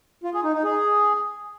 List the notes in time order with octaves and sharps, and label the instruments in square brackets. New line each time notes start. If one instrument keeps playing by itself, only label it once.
[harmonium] F4
G#4
D#4
D#4
G#4